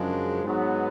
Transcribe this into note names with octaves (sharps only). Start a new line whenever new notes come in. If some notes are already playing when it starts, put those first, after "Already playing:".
Already playing: F#2 C#3 F3 G#3 D4
G#2 F#3 B3